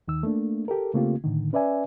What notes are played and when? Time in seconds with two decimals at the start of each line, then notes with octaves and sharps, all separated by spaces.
0.08 D#2 D#3 E6
0.23 A3 A#3 D4
0.68 G4 A4 A#4
0.94 C#3 A3 A#3 C4 F4 G4
1.24 A2 D3 D#3
1.53 C#4 B4 D5 E5 G#5